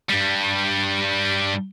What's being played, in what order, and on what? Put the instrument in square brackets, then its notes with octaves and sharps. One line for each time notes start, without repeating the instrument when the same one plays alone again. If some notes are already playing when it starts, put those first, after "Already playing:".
[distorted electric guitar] G2 G3